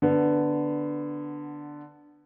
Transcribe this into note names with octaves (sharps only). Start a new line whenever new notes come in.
D3 B3